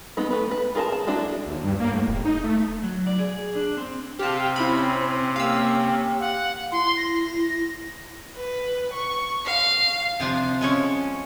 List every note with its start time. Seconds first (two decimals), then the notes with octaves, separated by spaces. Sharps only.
0.17 G#3 B3 D#4 B4
0.31 A3 B4
0.51 B4
0.75 F4 G#4 A#4 G#5 A5
0.92 A5
1.07 G#3 D4 E4 F#4 A4
1.47 D#2
1.64 G2
1.80 A#3
1.92 A2
2.08 E1
2.25 D#4
2.44 A3
2.83 F#3
3.07 D5
3.19 G#4
3.55 D4
3.77 C4
4.19 C3 G4 F5 G5 A5
4.56 C4 C#4 E4 B5
5.36 A#3 C#4 G4 F5 E6
6.20 F5 F#5
6.72 E4 C6
6.97 A#6
8.36 B4
8.93 C#6
9.45 F5
10.20 C3 F3 D4
10.61 G#3 C#4 C#5